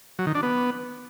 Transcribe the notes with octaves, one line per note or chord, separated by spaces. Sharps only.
F#3
D#3
D4
B3